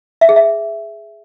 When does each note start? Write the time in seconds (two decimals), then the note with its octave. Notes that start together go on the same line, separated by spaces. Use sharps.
0.21 E5
0.29 G#4
0.36 E5